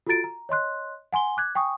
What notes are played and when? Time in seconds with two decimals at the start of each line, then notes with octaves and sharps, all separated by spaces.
0.07 F4 F#4 A4 A#5 A6 D7
0.24 A#5
0.49 C#5 D#5 C6 F#6
1.13 F#5 G#5 C6 G7
1.37 D6 F#6 G#6
1.55 G5 G#5 C#6 D#6